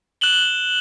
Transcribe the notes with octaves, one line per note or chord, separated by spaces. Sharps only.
F#6 E7 F#7 G7